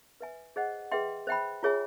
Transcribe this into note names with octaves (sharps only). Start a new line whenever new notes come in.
B4 E5 G#5
G#4 C5 D#5 F#5
G#4 B4 E5 G5 C6
C5 E5 G5 B5
F4 G#4 C#5 E5 G#5